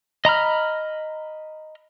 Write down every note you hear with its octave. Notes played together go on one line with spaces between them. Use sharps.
D#5 A#5 B5 F6